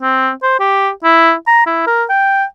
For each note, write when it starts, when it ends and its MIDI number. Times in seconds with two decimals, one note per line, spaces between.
0.02 0.30 60
0.43 0.55 72
0.60 0.90 67
1.04 1.33 64
1.47 1.64 82
1.66 1.82 64
1.87 2.04 70
2.09 2.44 79